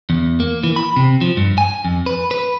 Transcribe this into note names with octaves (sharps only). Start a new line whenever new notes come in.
E2
A#3
E3
B5
C3
F3
G2
G#5
F2
B4
B4